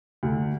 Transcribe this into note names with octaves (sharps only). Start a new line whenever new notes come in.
D2